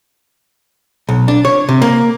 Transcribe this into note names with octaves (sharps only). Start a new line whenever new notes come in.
B1
D4
C#5
C3
A#3